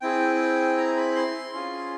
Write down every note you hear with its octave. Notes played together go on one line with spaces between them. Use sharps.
C4 E4 G#4 G5
A#5
B5
C6
C#4 F4 G#4